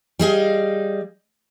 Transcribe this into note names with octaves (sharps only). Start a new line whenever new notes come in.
G3 G#4 D#5 F5